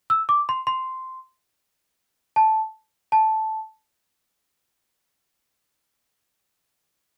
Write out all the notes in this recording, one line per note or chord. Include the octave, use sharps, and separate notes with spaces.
E6
D6
C6
C6
A5
A5